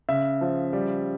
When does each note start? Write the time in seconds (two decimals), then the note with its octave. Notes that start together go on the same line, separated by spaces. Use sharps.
0.09 C#3 E5
0.41 F3
0.73 G3